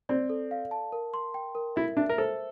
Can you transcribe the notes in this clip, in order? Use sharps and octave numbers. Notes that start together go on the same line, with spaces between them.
C4 D5
A4
F5
A5
A#4
C6
G5
A#4
E4 E5
D4 E5
A#4
A4 C5